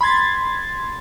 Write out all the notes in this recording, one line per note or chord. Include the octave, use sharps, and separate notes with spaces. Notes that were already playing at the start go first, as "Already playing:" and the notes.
B5 C6 G#6 A6